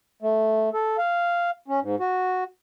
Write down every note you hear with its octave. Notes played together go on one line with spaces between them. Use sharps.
A3
A4
F5
C#4
G#2
F#4